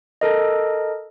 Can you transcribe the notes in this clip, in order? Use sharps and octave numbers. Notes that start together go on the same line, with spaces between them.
A4 A#4 D#5